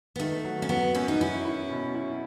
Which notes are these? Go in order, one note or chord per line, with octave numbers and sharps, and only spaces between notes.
B3
D#3 A3
F#3
C#4
F#3 B3
F#2 C#4
D#4
C#4 E4
E4
B2
E4